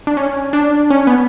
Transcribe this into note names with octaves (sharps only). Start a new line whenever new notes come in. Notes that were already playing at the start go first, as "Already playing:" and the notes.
D4
C#4
D4
C#4
B3